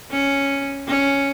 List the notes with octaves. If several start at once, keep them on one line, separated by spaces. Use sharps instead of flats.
C#4
C#4